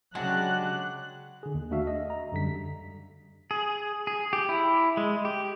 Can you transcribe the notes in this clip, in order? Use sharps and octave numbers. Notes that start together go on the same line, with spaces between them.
C#3 F#3 G#3 D4 F#4 G4 F#6
D3 G#4
D#2
A3 D4 F#4 E5 F5
D#5
A#5
F#2 D3 G3 B6
G#4
G#4
G4
E4
G#3
G4